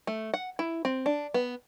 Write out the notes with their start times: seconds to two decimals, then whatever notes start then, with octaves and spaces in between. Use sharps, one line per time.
0.07 A3
0.34 F#5
0.59 E4
0.85 C4
1.06 D4
1.34 B3